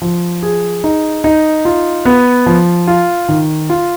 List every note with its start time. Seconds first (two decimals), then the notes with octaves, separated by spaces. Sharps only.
0.02 F3
0.43 G#4
0.84 D#4
1.24 D#4
1.65 F4
2.05 B3
2.46 F3
2.87 F4
3.29 D#3
3.70 F4